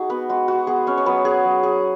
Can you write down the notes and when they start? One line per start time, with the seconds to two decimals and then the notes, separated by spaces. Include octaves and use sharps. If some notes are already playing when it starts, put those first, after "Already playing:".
Already playing: G#3 D#4 F#4 G#4
0.10 B3 B4
0.29 G#3 F#4
0.48 F#4
0.67 B3 G#4
0.87 C#4 C#5
0.98 C#5
1.06 F#3 B3 B4
1.25 G#4
1.45 F#3
1.63 G#4